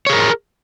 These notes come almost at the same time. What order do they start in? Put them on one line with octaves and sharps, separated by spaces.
C#5 G#4 A#4